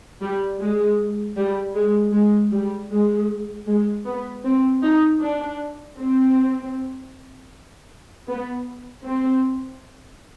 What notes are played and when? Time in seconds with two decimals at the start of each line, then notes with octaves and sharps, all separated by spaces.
0.21 G3
0.60 G#3
1.37 G3
1.75 G#3
2.13 G#3
2.52 G3
2.91 G#3
3.67 G#3
4.05 B3
4.44 C4
4.83 D#4
5.22 D4
5.98 C4
8.28 B3
9.05 C4